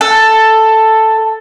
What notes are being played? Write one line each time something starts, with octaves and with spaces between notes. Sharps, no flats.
A4